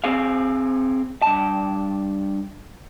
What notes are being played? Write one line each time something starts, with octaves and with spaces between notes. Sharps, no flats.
C4 G#4 F5
G2 A5